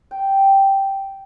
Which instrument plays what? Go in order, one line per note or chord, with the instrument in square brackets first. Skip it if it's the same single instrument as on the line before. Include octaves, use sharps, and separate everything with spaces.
[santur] G5